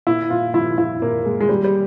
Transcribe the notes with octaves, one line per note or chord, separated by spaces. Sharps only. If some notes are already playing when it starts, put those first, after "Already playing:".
A#2 E4
A#2 F4
F3 E4
F3 E4
A#2 A#3
A#2 G#3
G#3
A#2 G3
G3